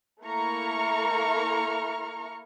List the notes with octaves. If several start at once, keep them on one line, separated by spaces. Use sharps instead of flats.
A3 A#3 E4 A#5 C#6 F6